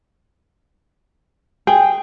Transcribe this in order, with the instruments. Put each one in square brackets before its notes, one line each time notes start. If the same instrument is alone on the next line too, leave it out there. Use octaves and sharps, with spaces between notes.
[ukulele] G#4 [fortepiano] G5